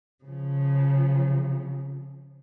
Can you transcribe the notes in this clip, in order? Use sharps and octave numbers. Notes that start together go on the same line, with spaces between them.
C#3 F3